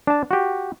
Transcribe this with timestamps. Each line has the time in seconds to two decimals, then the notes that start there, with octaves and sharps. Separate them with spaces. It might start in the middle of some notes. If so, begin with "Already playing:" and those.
0.07 D4 A5
0.31 F#4 G4